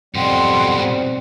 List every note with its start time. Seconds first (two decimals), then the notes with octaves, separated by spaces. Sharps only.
0.15 F2 G#2 B2 G3 F#5 G5 C6
0.78 C4